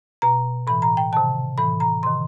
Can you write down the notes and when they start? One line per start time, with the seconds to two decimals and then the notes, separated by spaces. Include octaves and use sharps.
0.22 B2 A#5
0.67 A2 E3 B5
0.82 A#5
0.97 G5
1.13 C3 D#3 A5
1.58 A2 E3 B5
1.80 A#5
2.03 C3 D#3 C6